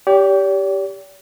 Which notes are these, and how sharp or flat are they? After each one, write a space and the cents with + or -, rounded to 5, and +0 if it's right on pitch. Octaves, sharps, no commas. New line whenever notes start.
G4 +0 D5 -45